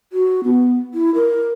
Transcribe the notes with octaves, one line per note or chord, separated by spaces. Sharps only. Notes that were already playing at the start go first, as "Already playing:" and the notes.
F#4
B3
E4
A#4